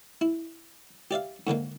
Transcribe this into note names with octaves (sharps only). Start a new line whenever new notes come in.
E4
G4 D5 E5 F5
G#2 D3 D#3 A#3